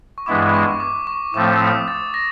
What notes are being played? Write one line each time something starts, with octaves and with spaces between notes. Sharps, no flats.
C#6
G2 E3 G#3 B3 E4 D6
C#6
D6
C#6
A2 F3 A3 C4 D6
D#6
A6
A#6